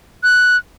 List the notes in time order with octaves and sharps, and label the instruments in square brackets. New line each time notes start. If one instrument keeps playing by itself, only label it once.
[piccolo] F#6